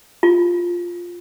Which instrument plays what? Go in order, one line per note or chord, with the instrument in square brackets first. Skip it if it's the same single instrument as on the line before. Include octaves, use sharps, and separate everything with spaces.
[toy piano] F4